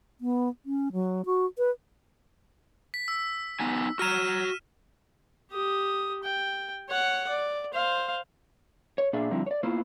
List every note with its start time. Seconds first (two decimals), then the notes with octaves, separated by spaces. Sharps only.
0.21 B3
0.65 C#4
0.92 F#3
1.25 F#4
1.58 B4
2.94 B6
3.08 E6
3.60 B3 D#4 G#5
3.99 F#4 A#5 F6 D#7 E7
5.51 G4 D#6
6.24 G5
6.89 C#5 F#5
7.29 D5
7.74 C5 F5
8.98 C#5
9.13 A#2 A#3 D4 G#4 D5 E5
9.31 D3 F3 G3 C4 D#4 E4
9.46 C#5 D5
9.63 A#3 B3 E4 F4 C5